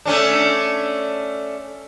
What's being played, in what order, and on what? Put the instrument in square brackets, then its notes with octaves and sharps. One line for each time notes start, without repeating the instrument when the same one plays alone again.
[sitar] A3 C#4 D4